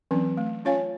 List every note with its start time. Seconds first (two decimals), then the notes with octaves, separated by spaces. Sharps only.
0.11 E3 F#3 C4 C#4
0.37 A3
0.65 C#4 F4 C#5 F5 G#5